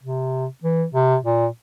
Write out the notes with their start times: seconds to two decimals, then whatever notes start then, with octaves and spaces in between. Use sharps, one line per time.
0.03 C3
0.64 E3
0.94 C3
1.25 A#2